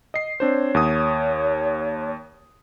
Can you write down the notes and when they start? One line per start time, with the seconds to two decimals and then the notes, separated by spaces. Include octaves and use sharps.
0.14 D#5 C7
0.40 C4 D4 C5 C#5
0.74 D#2 D#6